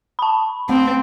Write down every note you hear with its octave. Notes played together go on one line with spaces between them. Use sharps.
A5 B5
A3 C4